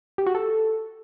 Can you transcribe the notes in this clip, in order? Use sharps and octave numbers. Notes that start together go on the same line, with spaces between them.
G4
F#4
A4